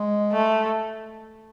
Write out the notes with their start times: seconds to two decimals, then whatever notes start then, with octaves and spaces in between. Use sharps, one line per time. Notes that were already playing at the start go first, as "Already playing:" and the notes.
Already playing: G#3
0.32 A3